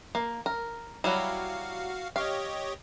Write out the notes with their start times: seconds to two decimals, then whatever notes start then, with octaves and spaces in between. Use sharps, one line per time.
0.15 A#3
0.46 A#4
1.04 F#3 G3 E4 F#4 F5
2.16 G4 C#5 D#5 F5